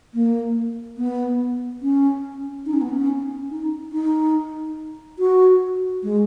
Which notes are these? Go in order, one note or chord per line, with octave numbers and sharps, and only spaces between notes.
A#3
B3
C#4
D#4
C#4
B3
C#4
D#4
D#4
F#4
G#3